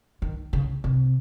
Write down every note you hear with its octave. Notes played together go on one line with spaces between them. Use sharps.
D#3
C#3
C3